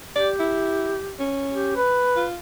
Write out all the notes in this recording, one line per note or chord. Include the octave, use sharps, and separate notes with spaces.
G4 D5
E4
C#4
G4
B4
F4